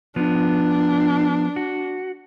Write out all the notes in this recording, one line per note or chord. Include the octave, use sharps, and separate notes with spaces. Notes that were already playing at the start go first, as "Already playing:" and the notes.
F3 B3 D4
F#4